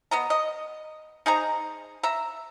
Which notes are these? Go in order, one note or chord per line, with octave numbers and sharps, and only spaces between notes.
B3 D#5 A#5
D#5
D#4 G#4 C5 A#5
E5 A#5